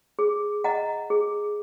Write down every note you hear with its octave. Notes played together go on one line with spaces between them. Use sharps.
G#4
D#5 F#5 A#5
G#4